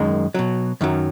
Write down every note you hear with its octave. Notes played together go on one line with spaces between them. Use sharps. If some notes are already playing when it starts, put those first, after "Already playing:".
Already playing: F#2 D#3 G#3
B2 F#3
F#2 D#3 F#3